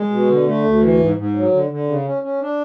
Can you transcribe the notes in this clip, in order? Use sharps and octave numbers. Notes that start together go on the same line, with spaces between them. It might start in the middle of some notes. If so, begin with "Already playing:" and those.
Already playing: G#3
B2
D3
A3
D2
E3
G#2
G#2
F#3
D3
D3
C#3
C#4
C#4
D4